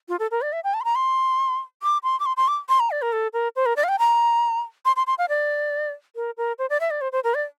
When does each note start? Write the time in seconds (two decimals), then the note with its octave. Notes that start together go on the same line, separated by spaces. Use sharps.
0.09 F4
0.20 A4
0.31 A#4
0.42 D5
0.53 E5
0.64 G5
0.74 A5
0.81 C6
0.84 A#5
0.95 C6
1.83 D6
2.03 C6
2.20 D6
2.26 C6
2.37 C6
2.48 D6
2.69 C6
2.80 A#5
2.91 D5
3.02 A#4
3.12 A4
3.33 A#4
3.56 C5
3.66 A#4
3.77 D5
3.84 F5
3.89 G5
3.99 A#5
4.85 C6
4.96 C6
5.07 C6
5.18 F5
5.29 D5
6.16 A#4
6.37 A#4
6.59 C5
6.70 D5
6.80 E5
6.91 D5
7.01 C5
7.12 C5
7.24 A#4
7.34 D5